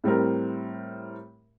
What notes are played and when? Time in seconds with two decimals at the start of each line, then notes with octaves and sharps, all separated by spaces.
0.04 A2 G3 C4 A#4